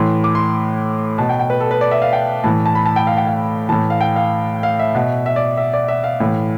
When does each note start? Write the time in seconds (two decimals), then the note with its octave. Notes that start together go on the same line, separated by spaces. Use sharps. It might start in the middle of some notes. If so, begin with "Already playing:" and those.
Already playing: A2 E3 C6
0.24 D6
0.35 C6
1.18 B2 A5
1.29 G5
1.39 G5
1.50 B4
1.60 A4
1.71 B4
1.81 D5
1.91 E5
2.02 F5
2.13 G5
2.44 A2 E3 A5
2.66 A5
2.75 B5
2.86 A5
2.96 G5
3.07 F5
3.17 G5
3.27 F5
3.69 A2 E3 A5
3.90 F5
4.01 G5
4.16 F5
4.63 F5
4.79 E5
4.95 B2
5.26 E5
5.36 D5
5.57 E5
5.74 D5
5.88 E5
6.04 F5
6.20 A2 E3